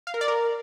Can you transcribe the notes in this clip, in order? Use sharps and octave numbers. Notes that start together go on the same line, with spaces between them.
F5
A#4
D5
A#4